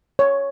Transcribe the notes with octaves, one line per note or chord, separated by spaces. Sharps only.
C#5